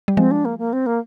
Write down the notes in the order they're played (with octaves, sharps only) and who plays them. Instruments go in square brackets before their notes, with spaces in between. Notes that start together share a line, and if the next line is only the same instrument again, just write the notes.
[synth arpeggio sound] G3
[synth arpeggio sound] F3 G#3 [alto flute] C4
[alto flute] D4
A#3
A#3
C4
A#3